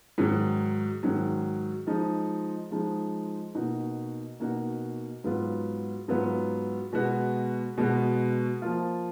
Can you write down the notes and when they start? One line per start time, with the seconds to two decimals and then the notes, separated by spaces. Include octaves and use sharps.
0.18 G#2 D#3 F#3
1.03 G#2 D#3 F#3
1.87 F3 G#3 D#4
2.71 F3 G#3 D#4
3.55 B2 A#3 D#4 F#4
4.40 B2 A#3 D#4 F#4
5.24 G#2 F#3 B3 F4
6.08 G#2 F#3 B3 F4
6.93 B2 G#3 B3 F#4
7.78 B2 G#3 B3 F#4
8.62 F3 A#3 F4